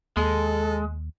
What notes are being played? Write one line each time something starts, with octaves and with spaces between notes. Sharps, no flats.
D#2 G#3 A4